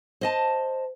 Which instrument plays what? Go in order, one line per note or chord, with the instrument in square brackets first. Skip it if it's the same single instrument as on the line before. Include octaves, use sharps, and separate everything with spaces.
[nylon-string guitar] C5 D#5 A5